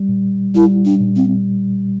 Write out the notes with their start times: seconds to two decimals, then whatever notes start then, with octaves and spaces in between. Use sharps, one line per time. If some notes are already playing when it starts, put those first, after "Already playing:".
Already playing: G3
0.08 A#2
0.54 G3 E4
0.85 D4
1.00 A#2
1.16 C4